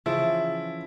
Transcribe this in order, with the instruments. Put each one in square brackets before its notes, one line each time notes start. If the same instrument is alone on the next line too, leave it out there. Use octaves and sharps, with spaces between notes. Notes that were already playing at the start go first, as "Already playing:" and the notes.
[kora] C#3 E3 F3 [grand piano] E4